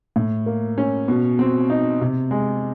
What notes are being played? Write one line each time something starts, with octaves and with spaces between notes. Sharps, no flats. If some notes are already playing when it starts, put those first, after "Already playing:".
A2
A#3
C#4
B2
C4
D#4
C3
G#3